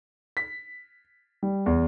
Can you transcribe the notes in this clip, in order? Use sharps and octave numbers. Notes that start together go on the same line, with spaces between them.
B6
G3
E2